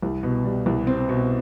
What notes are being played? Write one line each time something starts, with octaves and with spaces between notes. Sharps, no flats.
C2
B2
G3
C2
C4
B2